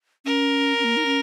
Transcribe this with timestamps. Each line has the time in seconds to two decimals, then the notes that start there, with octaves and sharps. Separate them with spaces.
0.25 C#4 A#4
0.79 C#4
0.84 A#3
0.97 D#4
1.06 C#4